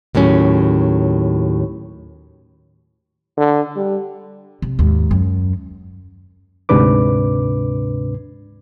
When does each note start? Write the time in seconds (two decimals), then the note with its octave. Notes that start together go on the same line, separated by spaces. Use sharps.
0.15 D#2 A2 F#3 C#4
3.37 D3
3.76 G3
4.62 C3
4.79 D#2 G#2
5.11 F#2
6.69 D2 G#2 C3 D4 B4 D6